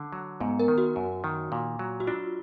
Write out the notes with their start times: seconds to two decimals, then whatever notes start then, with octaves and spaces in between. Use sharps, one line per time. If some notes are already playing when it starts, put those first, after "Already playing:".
Already playing: D3
0.12 F#3
0.40 G#2 B3
0.59 A#4
0.68 D#3
0.78 F#4
0.96 F#2
1.24 D#3
1.52 A#2
1.79 F#3
2.00 F#4
2.07 D4 F4